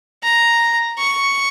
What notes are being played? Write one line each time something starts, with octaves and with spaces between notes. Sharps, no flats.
A#5
C#6